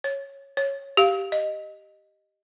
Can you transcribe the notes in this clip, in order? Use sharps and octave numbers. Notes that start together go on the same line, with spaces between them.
C#5
C#5
G4 F5
D#5